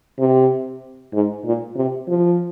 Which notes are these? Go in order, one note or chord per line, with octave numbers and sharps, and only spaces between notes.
C3
G#2
A#2
C3
F3